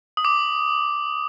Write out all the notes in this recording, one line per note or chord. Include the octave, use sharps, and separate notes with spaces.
D#6
D6